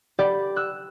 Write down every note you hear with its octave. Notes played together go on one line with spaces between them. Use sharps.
G4 D5 B5
E6 F#6